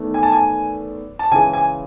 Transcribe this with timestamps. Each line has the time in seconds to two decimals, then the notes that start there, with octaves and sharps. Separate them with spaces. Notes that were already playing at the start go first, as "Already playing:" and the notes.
Already playing: E2 D#3 A3
0.14 G#5
0.23 A5
0.32 G#5
1.19 A5
1.31 C#3 E3 G#3 G#5
1.53 G#5